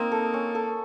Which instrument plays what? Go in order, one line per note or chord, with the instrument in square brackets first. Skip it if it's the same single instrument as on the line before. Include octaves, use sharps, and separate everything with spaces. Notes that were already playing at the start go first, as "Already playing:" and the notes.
Already playing: [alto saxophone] A#3 [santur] C4 D#4 D#5
[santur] A4
C#4
A4